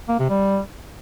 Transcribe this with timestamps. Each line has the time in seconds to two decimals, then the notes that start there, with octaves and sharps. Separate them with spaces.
0.09 A#3
0.19 C3
0.30 G3